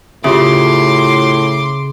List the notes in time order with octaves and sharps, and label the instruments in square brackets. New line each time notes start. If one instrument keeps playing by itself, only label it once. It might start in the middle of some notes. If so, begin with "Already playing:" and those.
[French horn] A2 [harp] C#3 [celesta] F4 G4 E5 [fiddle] C6 D6